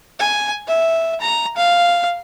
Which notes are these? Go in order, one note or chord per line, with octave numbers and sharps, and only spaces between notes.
G#5
E5
A#5
F5